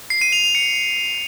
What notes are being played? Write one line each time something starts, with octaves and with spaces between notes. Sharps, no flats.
C7
D#7
F7
F7
C#7